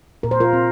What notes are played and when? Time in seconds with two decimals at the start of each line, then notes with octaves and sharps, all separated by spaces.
0.23 A#2 A#4
0.31 C5
0.40 F4 A#4
0.53 C4